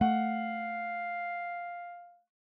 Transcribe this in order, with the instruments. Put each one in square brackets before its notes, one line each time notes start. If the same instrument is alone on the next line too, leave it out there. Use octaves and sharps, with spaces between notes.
[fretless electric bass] A3 [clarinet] F5 [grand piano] F#5